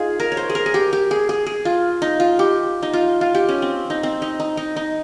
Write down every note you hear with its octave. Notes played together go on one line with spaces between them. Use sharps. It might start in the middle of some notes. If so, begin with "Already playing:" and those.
Already playing: D#4 F4 G#4
A#4
C#5
C5
G#4
A#4
G#4
G4
G4
G#4
G#4
G#4
F4
D#4
F4
G4
D#4
F4
F4
G4
C#4
C4
D#4
C4
D#4
D#4
D#4
D#4